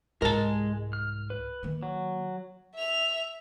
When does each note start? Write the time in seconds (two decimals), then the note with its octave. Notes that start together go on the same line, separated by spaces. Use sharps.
0.22 C2 G#2 G#3 A#4 A5
0.93 F6
1.30 B4
1.63 D#3 A#3
1.83 F#3
2.74 E5 F7